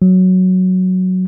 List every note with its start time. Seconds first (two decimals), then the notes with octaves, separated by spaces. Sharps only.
0.02 F#3